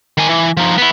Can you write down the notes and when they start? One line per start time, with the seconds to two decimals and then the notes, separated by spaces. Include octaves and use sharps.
0.18 D#3 G#5
0.29 E3
0.57 F3 D#4
0.78 B3 E4